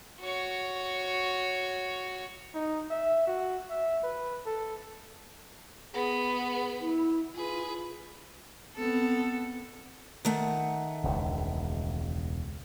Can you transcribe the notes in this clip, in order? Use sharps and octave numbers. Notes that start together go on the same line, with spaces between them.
F#4 C#5
D#4
E5
F#4
E5
B4
A4
B3 G#4
E4
F4 G#4 B4
B3 C4 A4
D#3 A3 F#5
E1 C#2